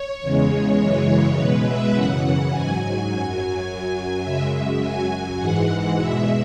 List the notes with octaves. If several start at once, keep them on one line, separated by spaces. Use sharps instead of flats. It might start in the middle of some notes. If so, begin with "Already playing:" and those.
Already playing: C#5
E2 C#3 G#3
F#2 C#3 E3 G#3 C#5
B2 G#3 B4
E5
F#2 C#3 E3 F#5
G#2 F#3 G#5
F#2 F#3
F#2 F#3
F#2 C#3 G#3 E5
F#2 F#3 G#5
G#2 E3 G#3 F#5
E2 B2 G#3 E5